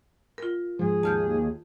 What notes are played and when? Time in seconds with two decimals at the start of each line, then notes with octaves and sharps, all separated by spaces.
0.38 F4 A#4
0.79 G#2 F3 G#4
1.03 D#2 A5 F6 G6